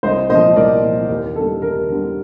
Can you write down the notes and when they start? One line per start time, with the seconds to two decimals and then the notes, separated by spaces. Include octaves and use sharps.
0.03 C2 C5 D#5
0.30 A#2 F3 C5 D#5
0.56 C2 A#4 D5
0.84 A#2 F3
1.09 D#2 A#4
1.36 D3 A4
1.40 G3
1.62 D#2 A#4
1.89 D3 G3